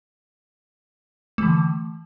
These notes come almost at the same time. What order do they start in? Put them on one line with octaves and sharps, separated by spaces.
A3 E3 D3